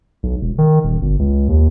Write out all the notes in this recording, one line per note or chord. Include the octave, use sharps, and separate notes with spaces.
B1
E1
D#3
D#1
G1
C#2
D#2